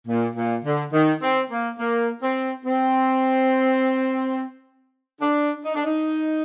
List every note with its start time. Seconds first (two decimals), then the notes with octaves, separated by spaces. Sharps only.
0.07 A#2
0.36 A#2
0.65 D3
0.93 D#3
1.22 C4
1.50 A#3
1.79 A#3
2.22 C4
2.65 C4
5.21 D4
5.65 D#4
5.75 D4
5.86 D#4